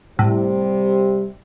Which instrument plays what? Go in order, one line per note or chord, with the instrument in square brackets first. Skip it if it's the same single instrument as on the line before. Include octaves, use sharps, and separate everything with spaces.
[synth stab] A2 [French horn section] C3 [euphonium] G3